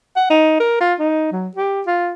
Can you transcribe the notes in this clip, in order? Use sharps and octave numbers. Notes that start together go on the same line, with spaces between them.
F#5
D#4
A#4
F4
D#4
F#3
G4
F4